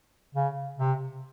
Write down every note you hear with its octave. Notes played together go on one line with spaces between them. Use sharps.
C#3
C3